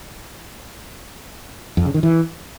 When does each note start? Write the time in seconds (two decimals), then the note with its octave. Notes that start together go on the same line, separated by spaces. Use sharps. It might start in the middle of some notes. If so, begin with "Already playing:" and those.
1.77 F2
1.86 C#3
1.94 D#3
2.03 E3